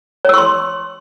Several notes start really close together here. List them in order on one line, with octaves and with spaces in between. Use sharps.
C#5 E6 C#6 C6